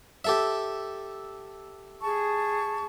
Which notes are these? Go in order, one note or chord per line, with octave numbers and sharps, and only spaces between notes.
G4 A4 E5
G#4 A5 C#6